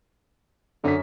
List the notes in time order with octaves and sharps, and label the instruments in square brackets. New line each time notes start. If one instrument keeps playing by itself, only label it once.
[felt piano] F#2 C#4 B6 [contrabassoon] D3